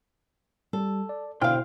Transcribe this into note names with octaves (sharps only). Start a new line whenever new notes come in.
G3 A4
D5
B2 D3 E4 C5 F5 G5 F6